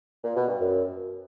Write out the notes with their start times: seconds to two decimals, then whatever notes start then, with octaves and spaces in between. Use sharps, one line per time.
0.24 A#2
0.36 B2
0.48 G2
0.60 F#2